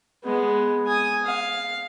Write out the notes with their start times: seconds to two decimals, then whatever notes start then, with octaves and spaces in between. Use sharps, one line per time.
0.24 G#3 B3
0.87 G#5 D#6
1.26 F5